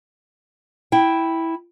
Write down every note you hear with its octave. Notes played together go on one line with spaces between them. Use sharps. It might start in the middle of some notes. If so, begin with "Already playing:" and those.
E4 G5